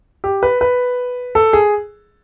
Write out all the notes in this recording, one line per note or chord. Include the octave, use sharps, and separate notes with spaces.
G4
B4
B4
A4
G#4